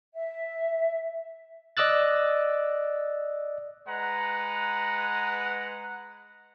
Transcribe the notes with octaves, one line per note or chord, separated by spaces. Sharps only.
E5
D5 D#5 D6 E6 F#6 A6
G#3 B4 F#5 A#5